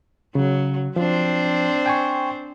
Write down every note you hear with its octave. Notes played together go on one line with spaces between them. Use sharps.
C#3 F#3
F3 C4 D4 C5
G5 G#5 C#6